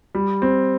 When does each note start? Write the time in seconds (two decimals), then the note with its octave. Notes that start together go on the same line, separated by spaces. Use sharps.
0.15 G3
0.42 C4